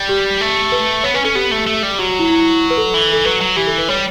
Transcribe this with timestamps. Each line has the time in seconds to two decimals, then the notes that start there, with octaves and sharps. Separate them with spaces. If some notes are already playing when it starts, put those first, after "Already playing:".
Already playing: G3
0.09 G4
0.41 A3
0.72 B4
1.04 B3 C#5
1.14 C#4 B4
1.24 C#4 A4
1.35 B3 G4
1.51 A3
1.67 A3
1.83 G3
1.98 F#3 F#4
2.09 F#4
2.19 E4
2.30 E4
2.70 B4
2.77 A4
2.94 E3
3.13 A4
3.25 F#3 B4
3.41 F#3
3.56 E3 G4
3.67 A4
3.78 B4
3.88 G3 C#5